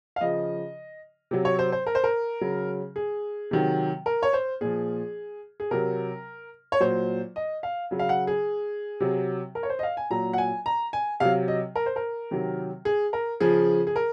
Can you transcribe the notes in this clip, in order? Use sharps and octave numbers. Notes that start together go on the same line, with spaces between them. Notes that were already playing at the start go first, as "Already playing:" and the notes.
F5
C#3 F3 D#5
C3 F#3
C#5
C5
C5
A#4
C5
A#4
C#3 F#3
G#4
C3 D#3 F#3
A#4
C#5
C5
A#2 F3 G#4
G#4
C3 F#3 A#4
C#5
A#2 F#3 C5
D#5
F5
C#3 F#3
F5
F#5
G#4
C3 F#3
A#4
C#5
C5
D#5
F5
G#5
A#2 F#3 A#5
F#5
G#5
A#5
G#5
C3 F#3 F5
D#5
A#4
C5
A#4
C3 D#3 F#3
G#4
A#4
C#3 F3 G#4
G#4
A#4